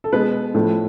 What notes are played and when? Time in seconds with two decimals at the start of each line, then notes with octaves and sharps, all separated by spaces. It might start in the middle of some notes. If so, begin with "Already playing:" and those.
0.04 A4
0.12 B2 G#3 B3 B4
0.54 A2 F3 A3